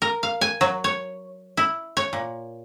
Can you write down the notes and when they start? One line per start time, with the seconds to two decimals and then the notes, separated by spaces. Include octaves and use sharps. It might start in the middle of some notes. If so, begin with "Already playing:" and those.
0.02 A#4
0.23 F5
0.41 G#5
0.61 F#3
0.84 C#5
1.57 E4
1.97 C#5
2.13 A#2